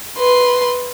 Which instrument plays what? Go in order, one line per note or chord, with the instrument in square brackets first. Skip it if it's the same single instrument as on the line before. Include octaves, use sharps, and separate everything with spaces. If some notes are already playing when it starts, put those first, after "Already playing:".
[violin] B4 C6